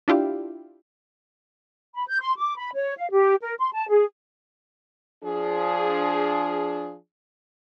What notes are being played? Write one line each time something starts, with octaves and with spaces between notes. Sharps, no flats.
D4 E4 F4 G4
B5
G6
C6
D6
B5
C#5
F5
G4
A#4
C6
A5
G#4
F3 D4 G#4